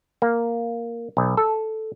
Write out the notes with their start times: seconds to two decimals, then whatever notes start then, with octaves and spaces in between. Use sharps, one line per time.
0.22 A#3
1.17 B1
1.37 A4